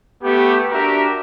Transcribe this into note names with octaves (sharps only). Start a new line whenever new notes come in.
A3 B3 G4
D4 F#4 G4 A#4 E5